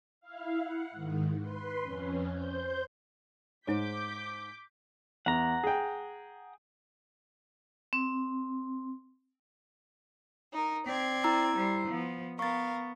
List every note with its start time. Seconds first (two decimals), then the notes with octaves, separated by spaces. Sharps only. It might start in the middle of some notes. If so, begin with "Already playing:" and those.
0.21 E4 F5
0.59 F#5
0.91 G#2 D#3
1.40 B4 C6
1.81 F2 C#4
2.32 C5 G6
3.67 G#2 D#4 G#4 C5 C#5 D6 G6 B6
5.26 E2 F#5 A#5
5.64 G#4 G5
7.93 C4
10.53 D#4 A#4
10.87 C4 D5 G#6
11.24 E4 A#5 E6
11.57 G3 C5
11.88 F3 B3
12.39 B3 A#4 F5 C#6 A6